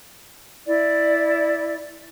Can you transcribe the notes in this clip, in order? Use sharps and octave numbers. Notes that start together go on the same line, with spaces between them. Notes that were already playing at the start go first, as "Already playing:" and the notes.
E4 D5